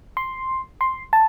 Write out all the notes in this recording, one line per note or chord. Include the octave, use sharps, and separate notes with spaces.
C6
C6
A5